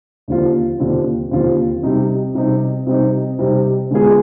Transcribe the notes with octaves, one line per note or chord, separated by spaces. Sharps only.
D#2 D3 F3 C4 F4
D#2 D3 F3 C4 F4
D#2 D3 F3 C4 F4
C3 G3 C4 D#4
C3 G3 C4 D#4
C3 G3 C4 D#4
C3 G3 C4 D#4
D3 G#3 B3 F4 G#4